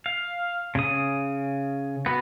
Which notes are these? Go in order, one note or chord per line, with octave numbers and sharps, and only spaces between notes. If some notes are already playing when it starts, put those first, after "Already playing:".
F5
C#3 D#6
B3 F#4